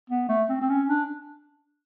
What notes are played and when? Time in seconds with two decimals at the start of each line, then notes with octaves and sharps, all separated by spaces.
0.10 B3
0.29 A3
0.49 C4
0.61 C4
0.69 C#4
0.89 D4